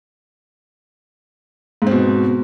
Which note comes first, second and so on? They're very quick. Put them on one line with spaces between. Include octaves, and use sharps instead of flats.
G#2 C4 B2